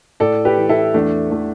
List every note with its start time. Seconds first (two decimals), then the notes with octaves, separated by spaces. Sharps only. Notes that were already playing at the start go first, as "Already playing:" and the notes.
0.20 A2 A4 D5
0.45 G4 B4
0.57 E3
0.69 E4 A4
0.94 E2 A3 D4
1.31 E3 A3